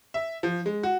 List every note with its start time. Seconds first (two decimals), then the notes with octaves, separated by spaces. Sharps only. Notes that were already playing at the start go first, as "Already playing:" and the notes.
0.14 E5
0.43 F3
0.66 G#3
0.83 F#4